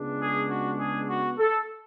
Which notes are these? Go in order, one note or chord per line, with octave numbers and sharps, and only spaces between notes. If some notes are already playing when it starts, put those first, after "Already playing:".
Already playing: C#2 C#3 G#3 B3 D4
G#4
F#4
G#4
F#4
A4